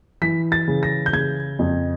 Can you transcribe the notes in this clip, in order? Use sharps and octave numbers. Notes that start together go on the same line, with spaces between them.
E3 B6
A6
C#3
A#6
G6
C#3 G#6
F2